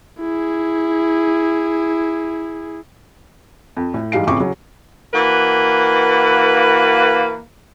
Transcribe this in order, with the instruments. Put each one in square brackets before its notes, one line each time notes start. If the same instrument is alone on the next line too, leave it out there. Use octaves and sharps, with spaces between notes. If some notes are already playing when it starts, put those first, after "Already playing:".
[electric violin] E4 G#4
[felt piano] F2
A2
G#2 E3 G3 F5 C7 D7
A1 F2 C#3 E4 C#6 D6
C#3 F#3
[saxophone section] E3 A#3 F#4 B4